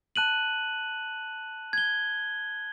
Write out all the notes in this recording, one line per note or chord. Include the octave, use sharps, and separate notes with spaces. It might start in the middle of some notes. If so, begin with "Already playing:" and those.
A5 F#6 D#7 F#7
G#6 G7